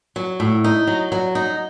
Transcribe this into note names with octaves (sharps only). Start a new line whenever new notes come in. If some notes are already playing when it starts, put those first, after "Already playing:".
F#3
A2
D#4
F#3
F#3
D#4